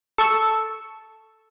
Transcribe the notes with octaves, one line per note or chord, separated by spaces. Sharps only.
A4 C#6 E6